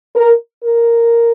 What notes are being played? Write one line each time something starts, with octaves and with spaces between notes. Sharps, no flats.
A#4
A#4